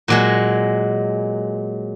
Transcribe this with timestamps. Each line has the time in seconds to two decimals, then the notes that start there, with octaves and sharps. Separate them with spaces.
0.08 A#2 F#3 G#3